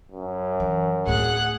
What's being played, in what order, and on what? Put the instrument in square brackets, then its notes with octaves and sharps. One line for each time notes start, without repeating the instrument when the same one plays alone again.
[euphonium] F#2
[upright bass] E3
[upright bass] D1 A2 [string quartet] G#4 F#5 F#6